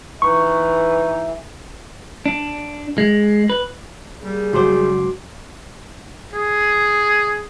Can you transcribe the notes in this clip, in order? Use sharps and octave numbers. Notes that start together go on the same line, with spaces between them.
E3 D#4 B4 C#6
D4
G#3
B4
G3 A#3 G4 G#4
C#2 F#2 F#4 C5 C6 D6
G#4